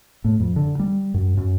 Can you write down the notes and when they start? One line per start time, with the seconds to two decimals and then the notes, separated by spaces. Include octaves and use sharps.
0.24 A2
0.40 F2
0.56 D3
0.79 G3
1.14 F#2
1.37 F#2